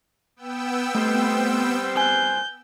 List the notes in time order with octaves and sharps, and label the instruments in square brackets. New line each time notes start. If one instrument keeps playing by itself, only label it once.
[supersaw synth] B3 G5 E6
[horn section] G3 C4 C5 [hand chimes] A3
[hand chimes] G#5 F#6 [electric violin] G6